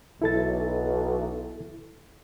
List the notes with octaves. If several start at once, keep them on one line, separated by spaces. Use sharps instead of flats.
B1 E4 A4 A6